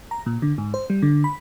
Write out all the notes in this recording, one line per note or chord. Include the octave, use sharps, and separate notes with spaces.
A#5
A#2
D3
G#2
C5
G3
D3
B5